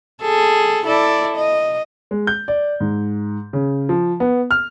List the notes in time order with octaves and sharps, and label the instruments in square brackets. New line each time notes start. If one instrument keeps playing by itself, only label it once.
[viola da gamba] G#4 A4
E4 A4 D5
D#5
[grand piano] G#3
G6
D5
G#2
C#3
F3
B3
F6